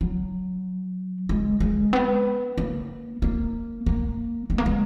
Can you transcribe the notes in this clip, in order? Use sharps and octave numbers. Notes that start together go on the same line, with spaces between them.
F#3
G#3
G#3
B3
A#3
A#3
A#3
G#3
A#3
G#3